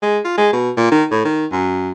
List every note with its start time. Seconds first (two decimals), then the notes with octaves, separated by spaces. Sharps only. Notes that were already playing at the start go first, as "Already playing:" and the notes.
0.02 G#3
0.25 F4
0.38 G#3
0.53 B2
0.77 A#2
0.92 D#3
1.11 A2
1.25 D#3
1.52 F#2